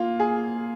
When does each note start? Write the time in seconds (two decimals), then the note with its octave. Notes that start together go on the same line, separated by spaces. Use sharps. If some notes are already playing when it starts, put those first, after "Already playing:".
Already playing: A#3 F4
0.20 G#4